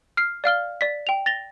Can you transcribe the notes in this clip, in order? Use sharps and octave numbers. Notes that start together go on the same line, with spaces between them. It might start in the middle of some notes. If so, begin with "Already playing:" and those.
F6 C7
D5 F5 F6 G7
D5 B6
G5 F7
A6 A#6 F7 G7